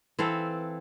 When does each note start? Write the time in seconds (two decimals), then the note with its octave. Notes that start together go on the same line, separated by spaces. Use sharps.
0.19 E3 C4 A4 F5